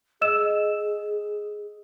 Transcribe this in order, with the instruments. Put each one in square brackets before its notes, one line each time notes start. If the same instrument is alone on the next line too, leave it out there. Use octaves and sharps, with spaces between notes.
[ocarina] G#4 [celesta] D#5 E6 E7